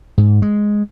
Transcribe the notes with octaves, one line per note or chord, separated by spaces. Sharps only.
G#2
G#3